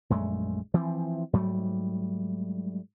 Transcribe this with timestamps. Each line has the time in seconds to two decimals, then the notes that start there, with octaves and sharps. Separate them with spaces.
0.10 A#1 F#2 G#3 A3
0.74 E3 F3 C4
1.33 G#2 F#3 G3 A3